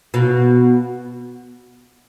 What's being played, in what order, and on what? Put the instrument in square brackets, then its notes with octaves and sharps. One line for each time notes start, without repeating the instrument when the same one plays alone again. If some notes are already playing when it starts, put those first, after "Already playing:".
[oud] B2